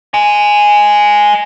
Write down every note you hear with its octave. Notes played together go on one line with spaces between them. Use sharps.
D#5 G#5